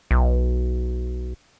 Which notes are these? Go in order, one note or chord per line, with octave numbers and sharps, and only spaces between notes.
B1